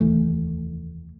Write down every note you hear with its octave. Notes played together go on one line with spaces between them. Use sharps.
F1 D#2 E3 A3